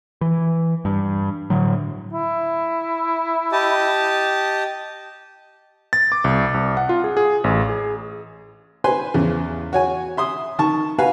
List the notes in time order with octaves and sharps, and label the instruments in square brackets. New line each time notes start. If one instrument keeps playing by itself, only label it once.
[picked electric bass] E3
G2
A2 D3 F#3
[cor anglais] E4
[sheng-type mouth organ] G4 D#5 A5
[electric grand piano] A6
D6
C2
C2
F#5
F4
G#4
G#4
A1
G#4
[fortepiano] B4 C5 G#5 C6
E2 C#3
F#4 C#5 G#5
E5 C6 D#6
D#3 A5 C#6
F#4 B4 F5 G#5